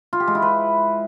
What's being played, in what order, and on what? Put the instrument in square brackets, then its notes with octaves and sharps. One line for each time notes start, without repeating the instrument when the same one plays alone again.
[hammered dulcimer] F4
G4
G#3
E4
B4